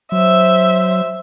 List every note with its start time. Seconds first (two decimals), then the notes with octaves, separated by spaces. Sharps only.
0.12 F#3 C5 E5